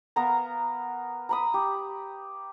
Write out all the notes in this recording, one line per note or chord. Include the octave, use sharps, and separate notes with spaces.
B3 A#4 F5 A#5
A#5 B5 D#6
G4